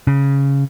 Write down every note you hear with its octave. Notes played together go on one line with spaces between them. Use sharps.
C#3